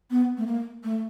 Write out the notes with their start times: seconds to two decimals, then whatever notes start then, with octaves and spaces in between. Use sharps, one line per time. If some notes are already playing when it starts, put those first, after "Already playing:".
0.11 B3
0.38 A3
0.47 A#3
0.84 A3